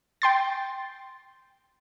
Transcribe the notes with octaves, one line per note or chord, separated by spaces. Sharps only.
G5 C6 A6